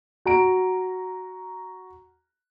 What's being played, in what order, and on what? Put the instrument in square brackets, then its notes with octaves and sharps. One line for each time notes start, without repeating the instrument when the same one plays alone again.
[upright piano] F#4 A#5 D7